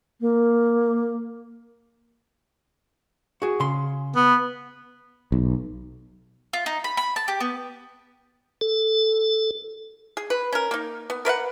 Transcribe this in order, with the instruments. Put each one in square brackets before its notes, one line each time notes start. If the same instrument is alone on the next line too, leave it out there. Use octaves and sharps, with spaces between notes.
[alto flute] A#3
[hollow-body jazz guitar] F#4 G#4
C#3 C6
[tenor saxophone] B3
[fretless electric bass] B1
[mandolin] F4
D#4
B5
B5
A5
G4
B3
[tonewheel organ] A4
[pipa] G#4
B4
C#4 A#4
A#3 D#4
B3
A#4 B4 F5 F#5